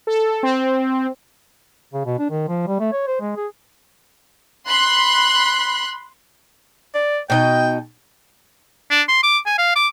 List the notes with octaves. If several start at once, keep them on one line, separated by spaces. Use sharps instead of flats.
A4
C4
C#3
B2
D4
D#3
F3
G3
A3
C#5
C5
G#3
G#4
B5 C6 F#6
D5
B2 D#4 D#5 G5
D4
C6
D6
G#5
F5
D6